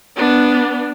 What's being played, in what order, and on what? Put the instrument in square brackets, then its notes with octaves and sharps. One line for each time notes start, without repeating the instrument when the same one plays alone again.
[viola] B3 D4